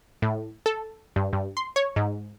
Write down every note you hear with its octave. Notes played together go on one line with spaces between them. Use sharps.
A2
A4
G2
G2
C6
C#5
G#2